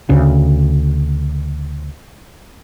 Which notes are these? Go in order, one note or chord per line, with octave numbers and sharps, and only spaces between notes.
D2 C#3